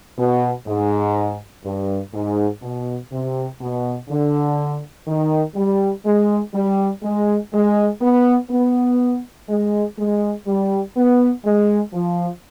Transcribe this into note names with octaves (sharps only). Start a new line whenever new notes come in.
B2
G#2
G2
G#2
B2
C3
B2
D3
D#3
G3
G#3
G3
G#3
G#3
B3
B3
G#3
G#3
G3
B3
G#3
F3